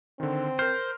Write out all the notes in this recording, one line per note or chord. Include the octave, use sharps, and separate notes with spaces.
D3 D#3 C4
A#4 C5 F6